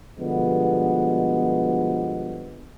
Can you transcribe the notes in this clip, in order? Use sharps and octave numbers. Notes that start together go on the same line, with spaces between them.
B2 D3 F3 G3 G#3 B3